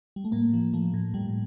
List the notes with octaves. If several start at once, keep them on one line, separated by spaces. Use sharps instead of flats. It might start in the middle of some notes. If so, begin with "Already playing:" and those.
G3
A3
A2 A#3
F3
F3 A3
A2
A2 G3